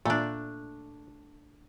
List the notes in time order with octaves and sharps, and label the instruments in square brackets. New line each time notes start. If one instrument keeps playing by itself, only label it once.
[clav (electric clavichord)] A#2 [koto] A3 D4